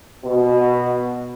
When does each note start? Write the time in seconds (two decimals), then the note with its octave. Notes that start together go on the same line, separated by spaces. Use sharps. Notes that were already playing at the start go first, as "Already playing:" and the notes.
0.24 B2